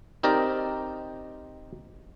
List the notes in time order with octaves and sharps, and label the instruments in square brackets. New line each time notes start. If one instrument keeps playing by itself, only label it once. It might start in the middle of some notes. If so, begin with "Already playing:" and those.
[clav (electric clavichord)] C4 D#4 G4 A#4 D5